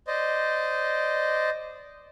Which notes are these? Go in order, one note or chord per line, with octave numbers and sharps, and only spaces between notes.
C5 D5 D#5